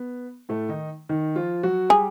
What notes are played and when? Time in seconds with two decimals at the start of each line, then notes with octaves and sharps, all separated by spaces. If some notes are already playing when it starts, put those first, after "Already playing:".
Already playing: B3
0.49 A2 A3
0.69 D#3 D#4
1.09 D#3 D#4
1.36 F3 F4
1.63 F#3 F#4
1.89 G3 G4 G#4